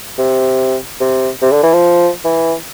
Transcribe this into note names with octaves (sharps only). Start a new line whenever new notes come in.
C3
C3
C3
D3
E3
F3
E3